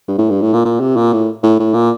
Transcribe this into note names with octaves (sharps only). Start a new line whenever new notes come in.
G2
A2
G2
A2
A#2
A#2
C3
A#2
A2
A2
A2
A#2